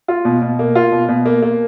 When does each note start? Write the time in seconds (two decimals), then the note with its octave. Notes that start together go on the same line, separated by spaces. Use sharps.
0.08 F4
0.25 B2
0.42 B2
0.59 A#3
0.75 F4
0.92 B2
1.09 B2
1.25 A#3
1.42 A#3